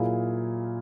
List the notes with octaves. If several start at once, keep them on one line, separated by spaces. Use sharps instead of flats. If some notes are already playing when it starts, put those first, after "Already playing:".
Already playing: A#2 F#3 A#3 E4 G#4